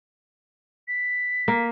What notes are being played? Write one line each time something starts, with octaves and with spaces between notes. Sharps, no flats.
B6
A#3